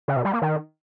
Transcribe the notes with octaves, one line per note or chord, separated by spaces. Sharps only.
C#3
B2
G3
A#3
D#3